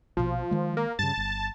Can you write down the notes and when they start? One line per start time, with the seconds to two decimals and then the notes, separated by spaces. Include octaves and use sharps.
0.17 A#1 B2 F3
0.51 D#3 G#3
0.77 A#3
0.99 G2 C#3 A5
1.17 G1